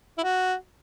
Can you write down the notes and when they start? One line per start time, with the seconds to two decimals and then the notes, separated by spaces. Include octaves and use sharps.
0.18 E4
0.23 F#4